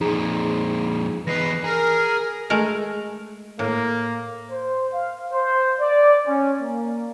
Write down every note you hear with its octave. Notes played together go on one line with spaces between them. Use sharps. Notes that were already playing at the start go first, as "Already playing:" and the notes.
F2 A#2 D#4 G#4 A#5
E2 D#4 B4 A#6 C7
G#4 A#4
G#3 A3 A#4
A2 A#3
C5
F5
C5
D5
C#4
A#3